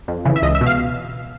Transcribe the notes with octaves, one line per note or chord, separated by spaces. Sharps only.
F2
C#3 E3
E5
C#2 D#5
E5
B2
F5